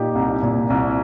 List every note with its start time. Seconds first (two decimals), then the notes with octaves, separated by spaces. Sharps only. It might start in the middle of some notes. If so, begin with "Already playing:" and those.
Already playing: A#2 D#4 G4
0.15 C2
0.43 A#2
0.70 C2